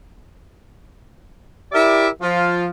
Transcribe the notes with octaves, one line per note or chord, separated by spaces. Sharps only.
E4 G4 A#4 D5 E5
F3 F4